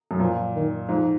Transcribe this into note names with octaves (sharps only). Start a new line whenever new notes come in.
F#2
A#2 F3
D#3
G#2 F3